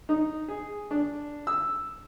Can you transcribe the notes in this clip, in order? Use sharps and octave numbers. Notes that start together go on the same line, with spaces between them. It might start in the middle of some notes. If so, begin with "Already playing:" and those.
D#4
G#4
D4
E6